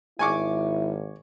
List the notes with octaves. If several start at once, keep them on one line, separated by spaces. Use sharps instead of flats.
G#1 E4 G#5 C#6 D6